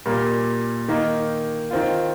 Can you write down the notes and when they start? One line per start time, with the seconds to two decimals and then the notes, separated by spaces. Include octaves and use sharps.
0.06 A#2 G3 A#3
0.88 D#3 A#3 D#4
1.71 D#3 C4 F4